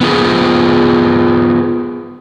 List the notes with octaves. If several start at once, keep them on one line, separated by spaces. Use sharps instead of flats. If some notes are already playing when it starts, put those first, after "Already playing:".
B3 F4 G#4